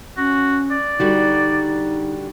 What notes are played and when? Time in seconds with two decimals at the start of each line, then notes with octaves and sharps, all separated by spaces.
0.18 C#4 F#4
0.71 D5
1.00 D3 G3 D#4 F#4